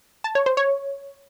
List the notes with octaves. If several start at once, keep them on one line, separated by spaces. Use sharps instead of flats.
A5
C#5
C5
C#5